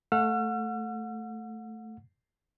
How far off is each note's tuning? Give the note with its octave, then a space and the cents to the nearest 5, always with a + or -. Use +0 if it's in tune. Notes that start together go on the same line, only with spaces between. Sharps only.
A3 +0 F#5 -35 E6 +45